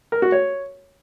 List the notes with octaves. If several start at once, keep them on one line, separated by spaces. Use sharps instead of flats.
A#4
F#4
C#5